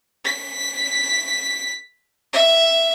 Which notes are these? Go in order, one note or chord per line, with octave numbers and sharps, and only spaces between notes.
B6
E5